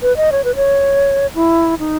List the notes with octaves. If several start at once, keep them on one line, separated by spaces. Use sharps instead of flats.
B4
D#5
C#5
B4
C#5
E4
D#4